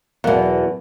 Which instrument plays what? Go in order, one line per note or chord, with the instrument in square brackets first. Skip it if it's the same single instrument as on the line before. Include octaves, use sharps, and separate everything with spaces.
[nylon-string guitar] E2 B2 [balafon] F#3 A#4 F5